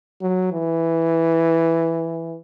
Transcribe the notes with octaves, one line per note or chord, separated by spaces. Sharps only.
F#3
E3